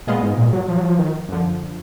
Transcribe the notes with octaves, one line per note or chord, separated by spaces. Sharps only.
A#2 G#3 B3 F4 G#4 D#5
G#2
A#2
F#3
F3
F#3
F3
D#3
F#2 D3 F3